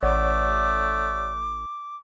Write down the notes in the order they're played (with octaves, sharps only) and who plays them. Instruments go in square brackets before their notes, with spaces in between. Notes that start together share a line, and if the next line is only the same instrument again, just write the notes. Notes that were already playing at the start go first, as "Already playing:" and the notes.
[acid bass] A1 [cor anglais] A3 [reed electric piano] C#5 D5 F#5 [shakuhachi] D6